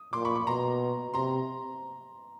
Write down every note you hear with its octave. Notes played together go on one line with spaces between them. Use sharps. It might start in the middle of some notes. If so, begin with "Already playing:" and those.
Already playing: D#6
A#2 C6 D6
B5 C#6
B5 C#6
B2 A#5 C6
C3 A#5 C6